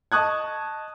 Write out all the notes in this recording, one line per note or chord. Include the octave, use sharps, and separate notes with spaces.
D#5 A5 C#6 D#6 F#6 G#6